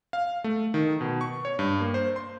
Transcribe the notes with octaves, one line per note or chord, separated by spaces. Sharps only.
F5
A3
D#3
B2
C#6
C#5
G2
A#3
C5
C6